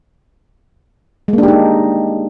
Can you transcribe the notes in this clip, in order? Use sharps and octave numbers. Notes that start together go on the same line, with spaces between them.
G#3 A#3 D4 D#4 G4